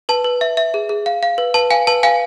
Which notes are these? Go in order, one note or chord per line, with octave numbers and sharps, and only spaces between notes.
B4 A5
B4
E5
E5
G#4
G#4
F5
F5
B4
B4 A5
F5 G#5
B4 A5
F5 G#5